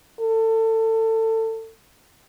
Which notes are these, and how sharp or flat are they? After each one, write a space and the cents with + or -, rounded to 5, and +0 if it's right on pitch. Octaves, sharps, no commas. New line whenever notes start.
A4 +25